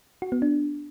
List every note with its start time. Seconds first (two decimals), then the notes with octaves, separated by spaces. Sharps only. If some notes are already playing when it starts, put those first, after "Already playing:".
0.22 F#4
0.32 B3
0.42 D4